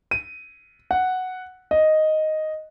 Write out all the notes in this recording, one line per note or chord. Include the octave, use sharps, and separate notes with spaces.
D#7
F#5
D#5